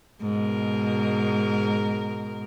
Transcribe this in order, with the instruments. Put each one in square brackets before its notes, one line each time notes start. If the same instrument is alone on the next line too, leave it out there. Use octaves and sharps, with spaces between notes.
[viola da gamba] G#2 B2 A#4